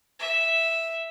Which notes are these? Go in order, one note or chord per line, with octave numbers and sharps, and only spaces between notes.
E5